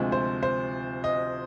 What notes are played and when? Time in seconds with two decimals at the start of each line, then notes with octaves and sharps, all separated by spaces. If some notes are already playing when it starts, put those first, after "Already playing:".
Already playing: D2 C3 F3 G#3 C5
0.12 C5
0.43 C5
1.04 D#5